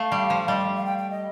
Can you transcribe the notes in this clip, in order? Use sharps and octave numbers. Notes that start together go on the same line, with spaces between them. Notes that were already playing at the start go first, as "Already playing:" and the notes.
Already playing: A3 F5
G3
F3
G3 D#5
F5
F5
G5
G5
D#5